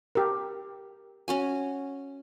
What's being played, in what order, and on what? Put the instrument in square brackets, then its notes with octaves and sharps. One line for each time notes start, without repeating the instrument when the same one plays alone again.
[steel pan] G4 A#4
[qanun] C#4 F#4 G#5